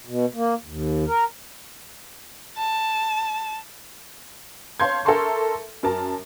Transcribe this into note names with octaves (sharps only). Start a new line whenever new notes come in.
B2
A#3
D#2
A#4
A5
C#5 F5 A5 C6 G6 G#6
A4 A#4 E5 A5 C6 C#6
F#2 A#4 A5